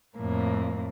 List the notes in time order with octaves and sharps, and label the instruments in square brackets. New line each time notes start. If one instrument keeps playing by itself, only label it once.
[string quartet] F2 A2 A#3